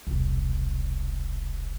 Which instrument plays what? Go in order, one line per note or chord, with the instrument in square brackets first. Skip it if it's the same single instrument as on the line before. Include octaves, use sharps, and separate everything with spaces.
[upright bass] E1 C2